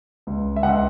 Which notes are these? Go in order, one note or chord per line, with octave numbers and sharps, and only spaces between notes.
C#2
E5
C#2 F#5